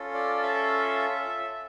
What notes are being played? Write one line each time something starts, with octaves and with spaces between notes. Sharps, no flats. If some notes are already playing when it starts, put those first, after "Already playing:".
Already playing: C#4 F4 A4
D5
E5